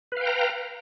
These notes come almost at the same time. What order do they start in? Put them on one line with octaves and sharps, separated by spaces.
B4 F5 G5 A#5